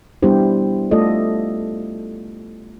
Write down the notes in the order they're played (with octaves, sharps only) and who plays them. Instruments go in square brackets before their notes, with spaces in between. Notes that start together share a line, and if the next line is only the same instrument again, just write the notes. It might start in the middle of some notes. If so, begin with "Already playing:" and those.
[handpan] G3 B3 D4 E4 G4 C5
A3 F4 A4 D5 D#5